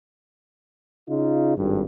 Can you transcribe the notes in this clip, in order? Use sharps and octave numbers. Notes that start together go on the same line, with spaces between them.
C#3 D#4 F4
G#1 G2